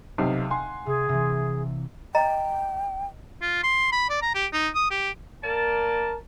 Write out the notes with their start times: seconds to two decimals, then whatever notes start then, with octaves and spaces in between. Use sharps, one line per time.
0.18 B1 C3 F5 C7
0.50 F#5 G#5 C6
0.86 C3 G#4
1.09 C3 E3
2.15 D#5 G5 A#5
3.42 F4
3.63 C6
3.92 B5
4.10 D5
4.22 A#5
4.35 G4
4.53 D#4
4.75 D#6
4.91 G4
5.44 A#3 A#4 D5 A5